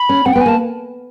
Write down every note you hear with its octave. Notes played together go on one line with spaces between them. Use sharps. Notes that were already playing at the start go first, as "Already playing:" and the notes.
Already playing: B5
C#4
C4 F#5
B3 G5
G#5
A#3
A5